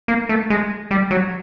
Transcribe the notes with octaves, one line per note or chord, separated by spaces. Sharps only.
A#3
A3
G#3
G3
F#3